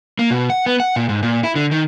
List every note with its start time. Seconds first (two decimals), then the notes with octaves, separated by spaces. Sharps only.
0.19 A#3
0.31 B2
0.50 F#5
0.66 B3
0.80 F#5
0.96 A#2
1.09 G#2
1.23 A#2
1.44 E4
1.56 D3
1.71 D#3